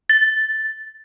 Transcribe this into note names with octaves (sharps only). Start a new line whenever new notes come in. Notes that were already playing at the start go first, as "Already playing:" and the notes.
A6